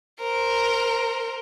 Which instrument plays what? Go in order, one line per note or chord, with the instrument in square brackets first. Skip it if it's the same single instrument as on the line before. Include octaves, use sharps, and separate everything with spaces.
[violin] A#4 C5